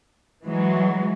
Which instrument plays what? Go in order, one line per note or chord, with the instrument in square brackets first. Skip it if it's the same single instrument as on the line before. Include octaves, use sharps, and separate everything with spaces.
[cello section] E3 F#3 G#3